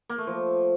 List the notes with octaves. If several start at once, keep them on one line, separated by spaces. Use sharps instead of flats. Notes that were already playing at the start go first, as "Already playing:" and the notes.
A#3
A3
F3